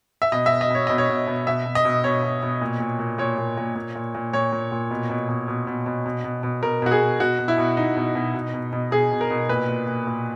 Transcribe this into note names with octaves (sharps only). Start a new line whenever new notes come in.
E5
B2 D#5
E5
B2
D#5
B2 C#5
B2 D#5
C#5
B2
B2
B2 E5
B2
D#5
B2
B2 C#5
B2
B2
A#2
A#2
A#2
A#2 C#5
A#2
A#2
A#2
A#2
A#2
A#2 C#5
A#2
A#2
B2
B2
B2
B2
B2
B2
B2
B2
B2
B2 A#4
B2 F#4
G#4
B2
B2 F#4
B2
E4
B2
B2 D#4
B2
B2
B2
B2
B2
B2 G#4
B2
A#4
B2
A#2 B4
A#2
A#2
A#2